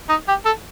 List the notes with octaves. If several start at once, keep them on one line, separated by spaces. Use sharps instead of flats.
D#4
G4
A4